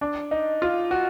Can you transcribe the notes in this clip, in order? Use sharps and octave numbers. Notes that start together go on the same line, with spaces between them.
D4
D#4
F4
F#4